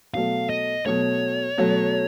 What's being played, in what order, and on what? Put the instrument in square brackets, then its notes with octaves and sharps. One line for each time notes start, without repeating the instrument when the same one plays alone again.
[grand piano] B2 F#3 A3 [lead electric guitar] F5
[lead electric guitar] D#5
[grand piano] B2 F#3 A3 [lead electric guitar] C#5
[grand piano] B2 F#3 A3